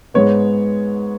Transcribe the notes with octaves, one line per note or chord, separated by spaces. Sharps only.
G#2 G#3 B3 C#5